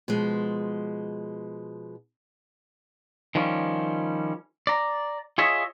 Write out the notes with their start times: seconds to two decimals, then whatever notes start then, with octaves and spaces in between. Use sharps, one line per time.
0.08 B2 F3 G#3
3.35 D#3 F3 G3 C#4
4.67 D5 A#5
5.38 F4 G#4 C#5 D#5 E5